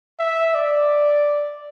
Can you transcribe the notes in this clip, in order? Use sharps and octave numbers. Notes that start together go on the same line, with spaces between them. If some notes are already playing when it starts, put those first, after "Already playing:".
E5
D5